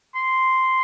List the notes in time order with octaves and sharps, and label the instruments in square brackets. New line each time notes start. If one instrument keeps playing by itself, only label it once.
[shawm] C6